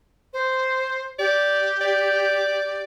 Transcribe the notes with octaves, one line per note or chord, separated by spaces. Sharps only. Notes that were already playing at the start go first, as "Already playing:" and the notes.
C5
G4 D5
D5